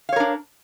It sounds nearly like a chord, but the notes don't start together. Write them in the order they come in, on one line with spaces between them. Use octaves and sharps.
F5 C#5 A#4 D4